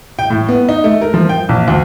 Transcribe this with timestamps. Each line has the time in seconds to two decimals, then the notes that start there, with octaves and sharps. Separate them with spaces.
0.19 G5
0.30 A2
0.49 B3
0.69 D#4
0.84 A3
1.01 A#4
1.14 F3
1.29 G5
1.49 A#1
1.68 D2